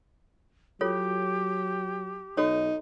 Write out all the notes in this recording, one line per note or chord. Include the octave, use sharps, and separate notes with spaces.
F#3 F4 G4 A4 C#5
B1 D#4 F#4 A4 C#5